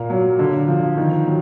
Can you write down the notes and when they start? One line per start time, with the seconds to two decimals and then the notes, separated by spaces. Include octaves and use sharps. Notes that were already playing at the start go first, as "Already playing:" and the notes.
Already playing: A#2 A#3
0.10 F#3
0.39 D3
0.68 F3
0.97 D#3
1.26 F#3